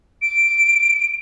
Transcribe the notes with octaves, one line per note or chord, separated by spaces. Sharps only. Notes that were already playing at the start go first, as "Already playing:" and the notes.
D7